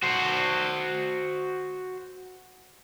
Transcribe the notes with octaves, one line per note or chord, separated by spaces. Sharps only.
F#4 C5